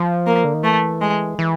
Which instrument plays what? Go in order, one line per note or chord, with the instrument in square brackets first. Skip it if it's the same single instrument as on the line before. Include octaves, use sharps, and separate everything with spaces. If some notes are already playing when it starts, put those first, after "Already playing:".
Already playing: [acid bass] F3
[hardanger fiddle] A#3
[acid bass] D3
D#3
[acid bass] E3 [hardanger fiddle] A3
[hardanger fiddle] G#3
[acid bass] E3